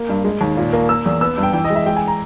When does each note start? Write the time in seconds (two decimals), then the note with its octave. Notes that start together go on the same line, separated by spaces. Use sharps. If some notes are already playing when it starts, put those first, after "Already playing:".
Already playing: A#3
0.09 G2
0.24 G#3
0.41 D#2
0.57 A#2
0.73 A#3
0.89 A#3 E6
1.05 E2
1.21 B3 E6
1.38 G2
1.43 G5
1.53 E3 G5
1.65 D#5
1.70 G#3
1.76 E5
1.86 G#3 G5
1.96 G#5
2.08 A#5